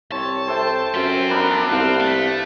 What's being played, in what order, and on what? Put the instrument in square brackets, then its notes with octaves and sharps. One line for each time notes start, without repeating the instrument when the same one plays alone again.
[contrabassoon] C2 [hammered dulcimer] C4 [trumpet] C#5 [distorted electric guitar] A5
[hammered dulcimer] A4 E5 G5 [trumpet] C5
[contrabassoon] F#2 [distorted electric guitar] C4 F4 [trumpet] C5
[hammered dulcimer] B3 D4 B5 [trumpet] A#4
[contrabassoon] C2 [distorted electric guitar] C4 [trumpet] F5
[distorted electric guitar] A3